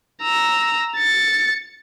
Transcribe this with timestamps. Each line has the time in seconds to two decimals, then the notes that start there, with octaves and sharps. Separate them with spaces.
0.23 A#5 E6
0.97 A6 C#7